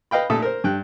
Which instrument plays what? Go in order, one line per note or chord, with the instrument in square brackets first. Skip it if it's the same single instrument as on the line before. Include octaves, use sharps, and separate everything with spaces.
[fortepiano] B4 D#5 F5 G5 B5
A#2 A3 A4 E5 D#6 E6
A#4 C5
G2 G5 F#6